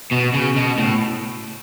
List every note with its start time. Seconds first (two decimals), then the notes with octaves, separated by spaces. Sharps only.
0.12 B2
0.34 C#3
0.56 B2
0.78 A2